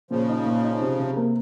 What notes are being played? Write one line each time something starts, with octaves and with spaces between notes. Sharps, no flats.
A#2 C#3 F3
D#4
A#2
D#4
C3
C3
A#3